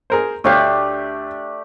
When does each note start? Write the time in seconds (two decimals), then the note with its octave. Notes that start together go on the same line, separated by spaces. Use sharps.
0.10 G#4 A#4 C5
0.44 D2 A3 D4 G4 C#5 F5